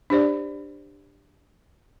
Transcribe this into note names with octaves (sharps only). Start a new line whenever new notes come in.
D4 G4 C5 D5